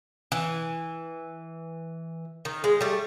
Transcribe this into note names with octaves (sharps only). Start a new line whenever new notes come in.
E3
D#3
G#3
G3 A3